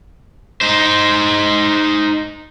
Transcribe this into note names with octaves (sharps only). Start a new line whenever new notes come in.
D#4 C5